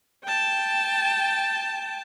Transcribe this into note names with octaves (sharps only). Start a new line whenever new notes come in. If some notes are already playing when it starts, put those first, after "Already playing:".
G5 A5